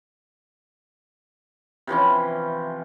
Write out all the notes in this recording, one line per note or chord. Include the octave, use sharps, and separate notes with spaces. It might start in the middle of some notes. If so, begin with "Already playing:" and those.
C3 E3 F3 C#4